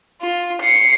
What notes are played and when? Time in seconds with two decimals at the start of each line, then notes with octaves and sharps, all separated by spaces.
0.21 F4
0.62 C7 C#7